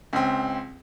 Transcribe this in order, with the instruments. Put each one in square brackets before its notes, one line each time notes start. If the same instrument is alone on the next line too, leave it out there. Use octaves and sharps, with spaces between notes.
[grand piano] C#2 C4